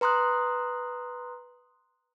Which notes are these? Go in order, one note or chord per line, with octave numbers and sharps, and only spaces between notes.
B4 A#5 C6 D#6 F#6